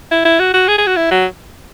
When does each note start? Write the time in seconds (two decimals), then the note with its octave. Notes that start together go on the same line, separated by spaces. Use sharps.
0.11 E4
0.25 E4
0.40 F#4
0.54 F#4
0.68 G#4
0.78 G#4
0.87 F#4
0.97 E4
1.11 F#3